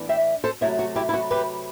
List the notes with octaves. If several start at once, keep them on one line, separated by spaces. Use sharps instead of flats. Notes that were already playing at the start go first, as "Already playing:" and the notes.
Already playing: A2 E3 B3 D4
E5 G5
A4 C5
C3 F#3 A3 E4
F#4
E4 G4
E4
F#4
G4 B4